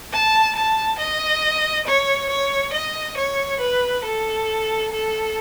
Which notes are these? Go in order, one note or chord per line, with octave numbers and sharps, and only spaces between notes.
A5
A5
D#5
C#5
C#5
D#5
C#5
B4
A4
A4